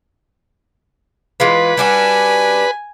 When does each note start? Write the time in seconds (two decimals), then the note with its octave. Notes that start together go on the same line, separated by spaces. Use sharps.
1.40 E3 G#3 F4 B4
1.77 G3 D4 F#4 G#5